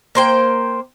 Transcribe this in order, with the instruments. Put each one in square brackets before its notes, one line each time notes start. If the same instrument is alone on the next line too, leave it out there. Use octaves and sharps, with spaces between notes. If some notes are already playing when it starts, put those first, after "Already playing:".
[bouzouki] A#3 C5 G5